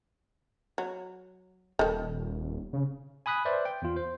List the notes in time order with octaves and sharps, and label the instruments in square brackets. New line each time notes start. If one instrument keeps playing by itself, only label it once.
[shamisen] F#3
[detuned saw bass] D#1 [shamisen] D#3 A4
[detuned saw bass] C#3
[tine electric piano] G#5 B5 D#6 F#6 B6
B4 C5 D5 E5
G5
E2 F4
C5